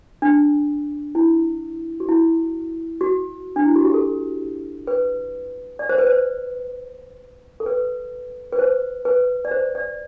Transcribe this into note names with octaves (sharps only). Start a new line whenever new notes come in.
D4
E4
F#4
E4
F#4
D4
E4
F#4
G4
A4
B4
D5
C5
B4
C5
A4
B4
B4
C5
B4
D5
C5
D5